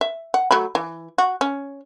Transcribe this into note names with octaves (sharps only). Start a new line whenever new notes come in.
E5
F#5
F#3 A3 B5
E3
F#4
C#4